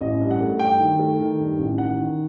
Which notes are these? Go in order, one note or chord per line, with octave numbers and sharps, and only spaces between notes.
A1 D#5
G2
F#5
A3
G2 G5
D#3
A3
D#3
G2
A1
D#3 F#5
D#3